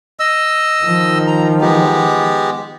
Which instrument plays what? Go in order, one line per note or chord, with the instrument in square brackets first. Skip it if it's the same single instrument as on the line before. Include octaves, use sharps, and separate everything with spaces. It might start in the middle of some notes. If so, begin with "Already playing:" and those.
[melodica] D#5 E6
[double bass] D#3 F3
[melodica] A#5
G#3 B3 G4